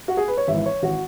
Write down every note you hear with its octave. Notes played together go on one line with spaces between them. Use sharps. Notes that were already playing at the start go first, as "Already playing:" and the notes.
F#4
G#4
B4
C#5
G#1 G#2 E3 E5
C#5
G#1 E3 F#4